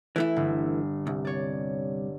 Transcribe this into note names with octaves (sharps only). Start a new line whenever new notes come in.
E3 A3 E4
G1
C2
C#5 D5